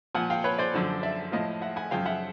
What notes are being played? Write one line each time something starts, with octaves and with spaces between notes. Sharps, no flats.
A#2 F3 F#5 G#5
F5 G5
B4 C#5
C5 D5
F#2 D3 F3
D5 E5
A2 F3 D#5 F5
E5 F#5
F#5 G#5
F#2 C#3 F3 F5 G5
E5 F#5